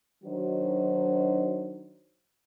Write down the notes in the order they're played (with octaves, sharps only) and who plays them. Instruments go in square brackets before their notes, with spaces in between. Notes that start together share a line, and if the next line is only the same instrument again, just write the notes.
[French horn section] D#3 F#3 D4 D#4 F#4 C5